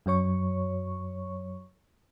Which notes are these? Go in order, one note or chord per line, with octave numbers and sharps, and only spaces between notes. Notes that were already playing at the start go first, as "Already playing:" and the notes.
F#2 F#3 C#5 C#6